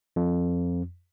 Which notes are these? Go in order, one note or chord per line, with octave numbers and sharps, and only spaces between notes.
F2